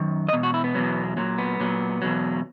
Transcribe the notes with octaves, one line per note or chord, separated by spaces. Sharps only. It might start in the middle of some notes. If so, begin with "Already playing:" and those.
Already playing: F#2 D#3
D#5
E2 B2
F#4
E4
B3
E2 B2 F#3
A#2 F#3
B3
A#2 F#3
E2 B2 F#3